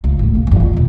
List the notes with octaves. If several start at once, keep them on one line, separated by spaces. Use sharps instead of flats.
C#2
G#1 A2
C3 A#3
G2 E3
F4
E2 B2